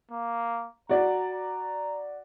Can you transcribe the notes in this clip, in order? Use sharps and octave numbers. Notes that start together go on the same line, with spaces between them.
A#3
F#4 D5 A#5
A#5